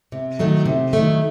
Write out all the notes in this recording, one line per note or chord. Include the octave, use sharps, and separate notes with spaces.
C3
D#3 F#3 A3
C3
D#3 F#3 A3